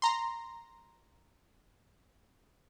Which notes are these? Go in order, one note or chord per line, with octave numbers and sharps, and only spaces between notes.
A#5 C6